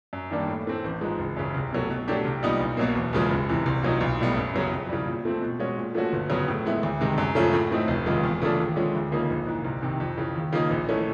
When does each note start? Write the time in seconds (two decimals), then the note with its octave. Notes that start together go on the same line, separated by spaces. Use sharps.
0.13 F#2
0.31 D#3 G3 A#3 D4
0.48 A2
0.67 E3 A3 C4
0.84 A1
1.01 G#2 F3 G#3
1.19 F#1
1.37 F#2 C#3
1.54 C2
1.72 B2 F#3 A3
1.90 B2
2.08 F#3 A3 D4 G4
2.25 C2
2.43 A#2 G3 B3 D#4
2.60 B1
2.77 B2 F#3 A#3
2.95 E1
3.13 E2 C#3 F3 G#3
3.30 F#1
3.48 E2 C3 E3
3.66 C2
3.83 A#2 F#3 A#3 D#4
4.00 B1
4.19 A2 E3 G3 B3
4.37 F#2
4.53 C#3 F#3 B3
4.72 F2
4.89 C#3 E3 G3
5.06 A#2
5.25 F3 A3 C4
5.41 B2
5.60 G#3 C#4 F#4
5.77 A#2
5.94 F3 A3 C#4 F#4
6.12 G1
6.30 F2 C#3 F#3 B3
6.48 A2
6.65 E3 G#3 B3 E4
6.83 D2
7.01 C3 D#3 G#3
7.18 F#2
7.35 C#3 F3 A3 C#4
7.53 A2
7.71 E3 A3 C4 D#4
7.88 F1
8.06 D#2 C#3 F3 G#3
8.23 E2
8.41 C#3 F3 A3 D4
8.59 D#2
8.76 D3 F3 G#3 C#4
8.95 D2
9.12 C#3 F3 A#3 D#4
9.30 A#1
9.47 G#2 E3
9.64 C2
9.82 C3 D#3
10.00 F2
10.17 C#3 E3
10.35 D#2
10.53 C#3 F3 A#3 D#4
10.70 A#1
10.89 E3 A3 C#4